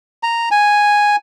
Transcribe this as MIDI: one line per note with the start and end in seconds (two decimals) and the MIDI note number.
0.23 0.49 82
0.51 1.16 80